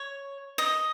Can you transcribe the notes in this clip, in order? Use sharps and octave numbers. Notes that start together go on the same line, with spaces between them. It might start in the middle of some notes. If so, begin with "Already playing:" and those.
Already playing: C#5
D#5